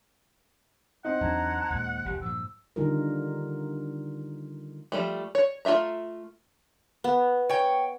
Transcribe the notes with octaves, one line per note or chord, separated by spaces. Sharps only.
C4 D#4 F#5
E2 F#3 D4 A5 A#5 G#6
D#2 A#2 G#3
E1 C2 F2 G4
G2 A#2 F3 E6
D3 D#3 G3 D#4 F4 A#4
F3 G3 A3
C#5
A3 F4 D#5 E5 A#5
B3
C#5 G5